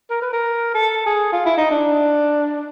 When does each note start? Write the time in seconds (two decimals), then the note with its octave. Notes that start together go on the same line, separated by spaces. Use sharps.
0.10 A#4
0.22 B4
0.33 A#4
0.74 A4
1.06 G#4
1.32 F4
1.45 E4
1.57 D#4
1.71 D4